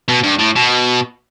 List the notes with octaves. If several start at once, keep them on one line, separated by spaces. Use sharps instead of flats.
B2
G2
A2
B2